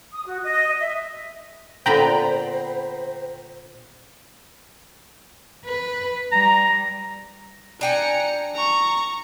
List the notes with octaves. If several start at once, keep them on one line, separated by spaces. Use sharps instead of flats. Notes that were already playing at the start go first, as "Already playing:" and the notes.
D#6
F#4
D#5
E5
A#2 D3 B3 C5 G5 A#5 B5
B4
G3 A#5
D4 G5 G#5 A#5 C#7
A#5 C#6